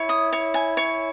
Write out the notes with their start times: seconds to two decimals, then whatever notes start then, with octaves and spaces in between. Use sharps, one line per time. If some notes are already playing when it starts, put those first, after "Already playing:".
Already playing: E4 C#5
0.09 D#6
0.33 C#5
0.54 G#5
0.77 C#5